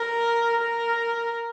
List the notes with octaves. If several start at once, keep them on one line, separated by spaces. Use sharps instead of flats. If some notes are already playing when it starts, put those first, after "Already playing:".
Already playing: A#4
A#4